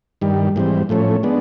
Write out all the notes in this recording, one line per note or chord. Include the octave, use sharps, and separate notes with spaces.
G2 D#3 G3
G#2 E3 G3 C4
A2 F3 A3 C#4
G#3 B3 D4